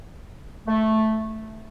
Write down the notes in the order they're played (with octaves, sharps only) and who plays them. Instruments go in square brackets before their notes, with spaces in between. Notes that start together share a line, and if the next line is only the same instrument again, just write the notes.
[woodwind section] A3